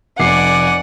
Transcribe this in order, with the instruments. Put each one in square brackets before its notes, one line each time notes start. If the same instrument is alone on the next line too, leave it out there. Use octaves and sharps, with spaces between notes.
[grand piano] F1 C7 [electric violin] D5 G#5 [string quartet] F#5 [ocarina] D6